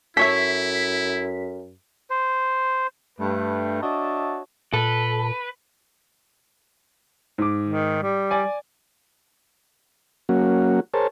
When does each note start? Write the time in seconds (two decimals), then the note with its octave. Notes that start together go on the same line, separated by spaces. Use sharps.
0.17 F#2 E4 A4 C#5 E5 B6
2.10 C5
3.19 G2 A3 B4
3.82 D4 F#4 C#5 D#5 E5 A5
4.73 A#2 A4 B4
7.38 G#2 D6
7.69 D#3
8.02 G3
8.31 D5 G#5
10.29 F#3 A#3 C#4 F#4
10.94 G#4 A#4 C5 C#5 A5